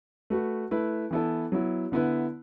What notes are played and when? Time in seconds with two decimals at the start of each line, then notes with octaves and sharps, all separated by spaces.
0.30 A3 F#4 B4
0.71 A3 E4 B4
1.11 E3 B3 E4 A4
1.52 F#3 B3 E4
1.92 D3 B3 E4 B4